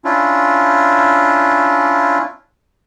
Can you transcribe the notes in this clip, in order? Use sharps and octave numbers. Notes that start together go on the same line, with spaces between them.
C#4 D4 E4 F4